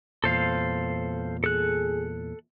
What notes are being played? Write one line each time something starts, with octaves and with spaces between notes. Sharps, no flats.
E2 A#2 A4 C5 F5
G#4 A4 F#6